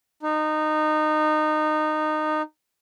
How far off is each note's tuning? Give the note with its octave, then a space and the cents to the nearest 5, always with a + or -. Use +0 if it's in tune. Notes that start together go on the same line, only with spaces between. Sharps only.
D#4 -20